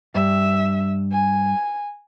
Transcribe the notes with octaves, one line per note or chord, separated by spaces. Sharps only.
G2 E5
G#5